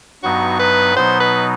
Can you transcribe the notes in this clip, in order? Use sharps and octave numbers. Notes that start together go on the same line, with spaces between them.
G2 F#3 B3 D#4 F#4
B4
B2 F#3 B3 D#4 C5
B4